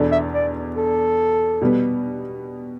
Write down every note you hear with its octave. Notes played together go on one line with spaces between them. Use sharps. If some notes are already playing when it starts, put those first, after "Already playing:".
Already playing: E2 B2 B3 D4 A4
E5
D5
A4
B2 G3 B3